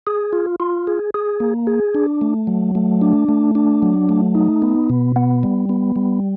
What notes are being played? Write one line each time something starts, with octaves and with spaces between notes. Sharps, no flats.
G#4
F4
F4
G#4
G#4
A#3
G#4
D4
A3
F#3
A3
D4
A3
D4
F#3
A3
D#4
B3
B2
B3
G3
B3
G3